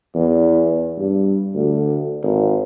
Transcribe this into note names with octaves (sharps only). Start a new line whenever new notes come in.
E2
G2
D2
G#1